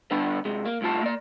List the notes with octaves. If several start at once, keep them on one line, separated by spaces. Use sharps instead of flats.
D3 G3 B3 D4 G4 B4
C3 G#3
A#3
C2 A2 C3 F4 A5
A#3 D5